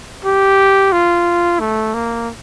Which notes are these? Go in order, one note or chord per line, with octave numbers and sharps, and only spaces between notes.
G4
F4
A3
A#3